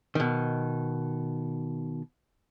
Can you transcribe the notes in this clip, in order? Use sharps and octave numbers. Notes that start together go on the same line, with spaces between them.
B2 D#3